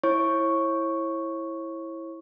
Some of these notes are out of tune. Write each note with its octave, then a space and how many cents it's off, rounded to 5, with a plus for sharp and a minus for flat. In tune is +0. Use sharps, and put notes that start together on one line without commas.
E4 +0 C#5 -40 C#6 +0